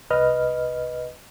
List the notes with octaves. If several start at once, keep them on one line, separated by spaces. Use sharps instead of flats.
C2 B4 D#5 F6